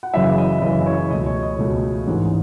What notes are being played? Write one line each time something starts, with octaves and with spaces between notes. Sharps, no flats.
F#5
F#1 F#2 C#3 E3 E4 E5
D#5
F#1 F#2 C#3 E3 D#5
C#5
C#2 B2 A3 D#5
C#5
D#5
C#2 B2 A3
A1 G#2 E3 G#3